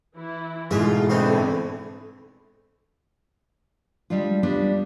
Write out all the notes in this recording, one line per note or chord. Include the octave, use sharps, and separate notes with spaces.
E3 E4
G#2 B2 E3 G#3 A3 F4 E5
D3 E3 A3 C4 D#4
G3 G#3 D4 F4
G3 B3 D4 F4